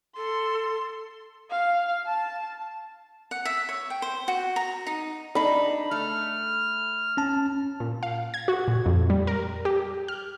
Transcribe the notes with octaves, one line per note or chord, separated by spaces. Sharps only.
A4 C6
F5
A5
F#5
E5
C#5
G5
C5
F#4
A#5
D#4
D4 D#4 B5
A3 F6
C#4 A5
A#2
F5
G#6
F#4
A#2
F2
G3
A#4
G4
F6